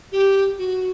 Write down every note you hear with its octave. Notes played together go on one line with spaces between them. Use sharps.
G4
F#4